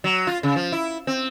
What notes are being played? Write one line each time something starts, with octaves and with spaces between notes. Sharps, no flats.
F#3
F4
C#3
F3
E4
C4